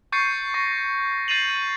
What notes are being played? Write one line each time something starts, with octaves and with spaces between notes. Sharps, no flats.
C#6 G6 A6 C7 C#7
C#6 A#6
G6 A6 C7 D#7 F7 F#7